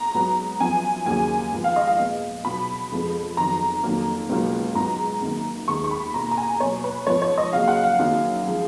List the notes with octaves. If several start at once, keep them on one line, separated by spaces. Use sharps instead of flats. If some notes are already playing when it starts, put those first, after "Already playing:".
Already playing: A#5
G#2 F#3 B3
F#2 F3 B3 G#5
D#2 C#3 F#3 A#3 G#5
G#2 F3 B3
F5
D#5
F5
A#2 G#3 B3
B2 F#3 B3 B5
F2 F3 G#3 B3
F2 D#3 F#3 B3 A#5
F2 D#3 F#3 A#3
C#2 B2 F#3 A#3
G#2 F#3 B3 A#5
F#2 D#3 A#3
D#2 D#3 G#3 B3 C#6
C#6
B5
B2 A#3 A#5
A#5
G#5
B2 F#3 A#3 C#5
B4
G#2 F3 B3 C#5
C#5
D#5
F#2 C#3 F#3 A#3 F5
F#5
F5
F#2 D#3 F#3 A#3
F3 G#3